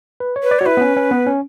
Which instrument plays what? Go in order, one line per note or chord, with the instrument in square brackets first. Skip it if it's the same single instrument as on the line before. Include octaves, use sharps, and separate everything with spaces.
[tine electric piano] B4
C#5
[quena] B4
[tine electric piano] D5
[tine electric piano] F#4 [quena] C#5
[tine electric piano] E4 [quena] B4
[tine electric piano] B3
C#4
C#4
B3
C#4